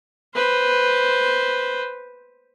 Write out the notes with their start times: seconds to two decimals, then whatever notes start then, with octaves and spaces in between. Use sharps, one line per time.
0.35 B4 C5